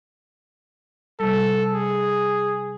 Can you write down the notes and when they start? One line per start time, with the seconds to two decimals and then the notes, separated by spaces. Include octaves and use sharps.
1.20 C3 G3 A4
1.73 G#4